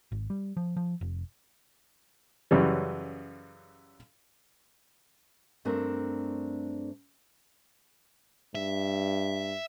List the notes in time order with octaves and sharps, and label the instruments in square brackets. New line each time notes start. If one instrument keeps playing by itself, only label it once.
[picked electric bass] G#1
G3
F3
F3
F1
[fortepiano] F#2 C#3 E3 G3
[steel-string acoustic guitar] G2 A3 C4 D4 A#4
[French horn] G2 [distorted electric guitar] E5